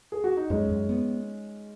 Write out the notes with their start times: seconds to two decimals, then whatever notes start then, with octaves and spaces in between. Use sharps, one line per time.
0.12 G#4
0.24 F#4
0.37 D#4
0.50 F#2 G#3 C#4
0.69 F#2
0.89 B3